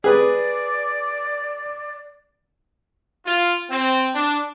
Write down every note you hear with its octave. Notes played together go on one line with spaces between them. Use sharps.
G#4 B4 D5
F4
C4
D4